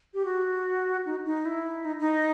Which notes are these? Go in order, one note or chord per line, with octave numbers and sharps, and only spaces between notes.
G4
F#4
D#4
D#4
E4
D#4
D#4